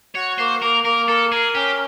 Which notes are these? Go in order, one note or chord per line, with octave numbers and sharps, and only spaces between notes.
F#4 C#5
A#3 C5
A#3 A#4
A#3 A#4
A4 A#4
G#4 A#4
C#4 G4